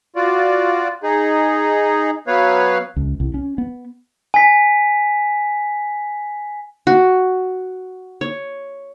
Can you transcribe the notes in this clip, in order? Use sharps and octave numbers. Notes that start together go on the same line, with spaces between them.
F4 F#4 D5
D#4 G#4
F#3 B3 B4 C#5 F5
C#2
C2
C#4
B3
G#5 B6
F#4
C#5